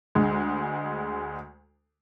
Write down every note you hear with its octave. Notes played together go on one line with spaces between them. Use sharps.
D2 G#3